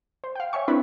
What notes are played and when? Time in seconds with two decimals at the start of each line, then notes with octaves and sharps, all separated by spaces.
0.24 C5
0.35 F5 G5
0.53 C#5 E5 G#5 C#6
0.68 C4 D4 E4 B4 B5